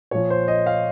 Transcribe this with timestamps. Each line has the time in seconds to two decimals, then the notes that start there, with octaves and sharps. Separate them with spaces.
0.11 A#2 F3 C#5
0.30 C5
0.48 D#5
0.66 F5